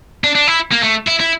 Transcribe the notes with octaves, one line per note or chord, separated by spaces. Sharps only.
D4
D4
E4
A#3
A3
E4
E4